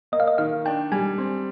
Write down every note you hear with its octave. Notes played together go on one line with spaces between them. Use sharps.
A#3 D#5
F5
D#5
D#3 F5
D4 G5
G3 G#5
C4